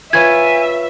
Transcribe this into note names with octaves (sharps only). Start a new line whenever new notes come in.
F4 B4 C#5 E5 G#5 G#6